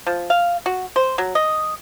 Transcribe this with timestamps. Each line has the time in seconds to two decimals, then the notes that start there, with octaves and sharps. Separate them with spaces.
0.06 F3
0.30 F5
0.66 F#4
0.96 C5
1.18 F#3
1.35 D#5